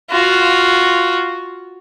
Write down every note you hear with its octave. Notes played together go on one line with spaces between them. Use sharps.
F4 F#4